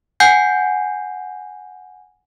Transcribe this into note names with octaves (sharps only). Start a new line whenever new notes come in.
F#5 G#5 G6 C7